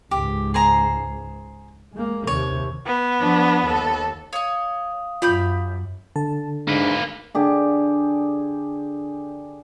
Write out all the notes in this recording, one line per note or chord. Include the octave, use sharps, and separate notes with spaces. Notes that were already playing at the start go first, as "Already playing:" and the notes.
C#2 G#2 G4
G#4 C5 A#5
G#3 A#3
D#2 C3 C#5
B3
F3 D4
D#2 A4
C#5 D#5 F5 D#6
F#2 F4 G4 B5 G6
D3 A5
G#2 A#3 D4 B4
D3 G4 G#4